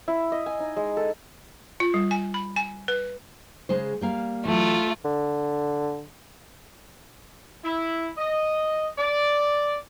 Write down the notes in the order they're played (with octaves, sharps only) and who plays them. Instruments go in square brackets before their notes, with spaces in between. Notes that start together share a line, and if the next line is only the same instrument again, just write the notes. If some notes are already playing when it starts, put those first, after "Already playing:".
[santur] E4
D#5
G#5
D#4
G#3
A4
[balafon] F4
G3
G#5
B5
G#5
B4
[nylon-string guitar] C#3 G#3 C5
G3 A#3 F5
[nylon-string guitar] E3 F#3 [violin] A3 F4
[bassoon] D3
[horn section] E4
D#5
D5